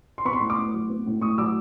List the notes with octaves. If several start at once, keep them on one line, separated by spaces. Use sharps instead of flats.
C6
B3 B5 C#6
C6
A2 C#6
C6 D6
A2
F#3
B3
A2
A2 C#6 D#6
F#3 D6 E6